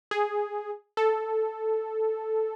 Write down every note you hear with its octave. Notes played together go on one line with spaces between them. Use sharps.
G#4
A4